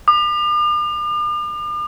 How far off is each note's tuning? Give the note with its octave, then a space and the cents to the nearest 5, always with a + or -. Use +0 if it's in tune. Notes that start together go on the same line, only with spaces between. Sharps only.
D6 +45